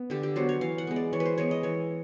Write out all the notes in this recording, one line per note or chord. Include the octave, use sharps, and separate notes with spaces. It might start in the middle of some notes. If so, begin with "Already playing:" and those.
Already playing: B3
D3 G4
G4
F#3 B3 C5
C#5
E3 F5
F#5
G#3 B3
D5
E3 C#5
B4
C5
G#3 B3 C#5
D#5
E3 C#5